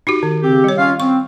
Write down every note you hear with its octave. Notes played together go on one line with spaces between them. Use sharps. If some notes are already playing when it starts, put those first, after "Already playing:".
D#4 F#4 G4
D#3
C#3 C4 G4
G3 C#5
C#4 F4 F5
C4 C#6